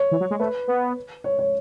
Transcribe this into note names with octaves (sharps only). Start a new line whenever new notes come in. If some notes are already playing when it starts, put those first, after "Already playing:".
Already playing: C#5
E3
F#3
G#3
A3 B4
B3
C#5
C#5